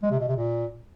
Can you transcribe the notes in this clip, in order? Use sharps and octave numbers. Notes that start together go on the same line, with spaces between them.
G#3
C3
B2
C3
A#2